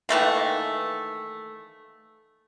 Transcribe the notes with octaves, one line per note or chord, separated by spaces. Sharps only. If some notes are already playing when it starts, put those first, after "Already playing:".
D#3 E3 A3 A#3